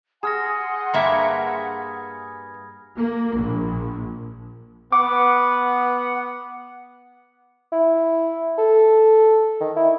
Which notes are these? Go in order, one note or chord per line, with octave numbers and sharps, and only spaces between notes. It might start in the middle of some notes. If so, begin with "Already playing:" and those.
G#4 F#5 G#5 A#5 C6 F6 A#6
G2 A#3 E5 B5 G#6
A#3
A#1
B3 F#5 D6
E4
A4
D#3
E4